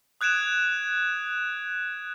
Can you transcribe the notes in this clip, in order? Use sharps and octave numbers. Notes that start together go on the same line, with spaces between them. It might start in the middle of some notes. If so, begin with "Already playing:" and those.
D#6 F#6 G#6 D7 E7 F7